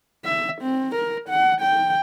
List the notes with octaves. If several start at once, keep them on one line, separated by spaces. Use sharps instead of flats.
E5
C4
A#4
F#5
G5